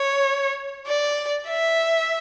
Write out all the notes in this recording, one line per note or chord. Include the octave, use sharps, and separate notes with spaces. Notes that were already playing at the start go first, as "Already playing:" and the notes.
Already playing: C#5
D5
E5